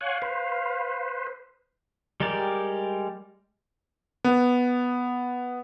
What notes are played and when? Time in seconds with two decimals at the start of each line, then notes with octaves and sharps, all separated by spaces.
0.01 C#5 F5 F#5 G#5
0.22 B4 C5
2.20 G3 G#3 G4 A#4 D5
4.24 B3